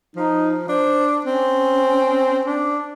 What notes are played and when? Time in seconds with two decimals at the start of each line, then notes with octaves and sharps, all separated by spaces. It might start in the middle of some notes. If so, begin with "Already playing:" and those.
0.16 F3 D#4
0.69 D4 C5
1.25 C4 C#4
2.45 D4